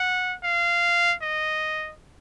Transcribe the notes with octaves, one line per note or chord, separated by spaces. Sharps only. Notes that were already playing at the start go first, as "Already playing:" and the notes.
Already playing: F#5
F5
D#5